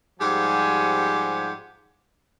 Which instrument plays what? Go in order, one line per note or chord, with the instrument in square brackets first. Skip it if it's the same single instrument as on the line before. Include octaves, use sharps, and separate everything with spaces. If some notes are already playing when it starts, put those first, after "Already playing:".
[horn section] G#2 F3 G3 G4 F#5 G#5